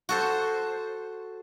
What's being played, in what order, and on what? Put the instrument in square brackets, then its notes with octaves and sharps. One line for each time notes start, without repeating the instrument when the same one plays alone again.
[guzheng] F#4 A4 C5